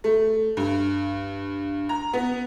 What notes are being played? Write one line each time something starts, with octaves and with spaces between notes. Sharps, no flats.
A3
G2
A#5
B3